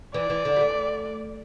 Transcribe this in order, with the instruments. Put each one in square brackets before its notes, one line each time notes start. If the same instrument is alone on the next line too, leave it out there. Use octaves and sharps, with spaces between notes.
[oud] E3 [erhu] D5
[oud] E3
D3
G3
A3